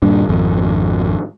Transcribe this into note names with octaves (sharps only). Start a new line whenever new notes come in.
D#1 G2 A#2 D4
G#1 F2